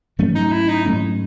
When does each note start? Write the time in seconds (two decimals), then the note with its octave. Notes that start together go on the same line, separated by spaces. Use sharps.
0.19 G#2 F#3 A3 C#4
0.35 D#4
0.51 E4
0.68 D#4
0.85 G#2 F#3 A3 C#4